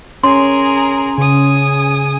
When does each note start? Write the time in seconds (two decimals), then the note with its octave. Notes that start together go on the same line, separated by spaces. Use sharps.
0.24 C#4 G#4 A#4 C#5 C6
1.18 C#3 G#5 D#6